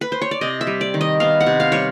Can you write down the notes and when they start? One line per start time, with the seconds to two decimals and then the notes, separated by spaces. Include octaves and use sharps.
0.01 B4
0.12 C5
0.22 C#5
0.31 D5
0.41 C3 D#5
0.61 E5
0.67 G3
0.81 D5
0.94 D#3
1.01 D#5
1.20 B3 F5
1.40 F#5
1.46 C3
1.60 F5
1.72 G3 C#5